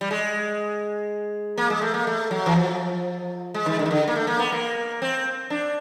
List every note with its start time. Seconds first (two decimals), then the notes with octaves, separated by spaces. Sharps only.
0.01 G3
0.11 G#3
1.58 A#3
1.70 G#3
1.82 A3
1.94 A#3
2.07 A3
2.31 F#3
2.46 E3
2.56 F3
3.54 G#3
3.66 D#3
3.79 D3
3.86 D#3
3.91 D3
4.07 A#3
4.16 A3
4.27 A#3
4.39 B3
4.52 A#3
5.02 C4
5.50 D4